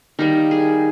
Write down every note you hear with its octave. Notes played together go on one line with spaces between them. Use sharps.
D#3 G3 A#3 D#4
G#4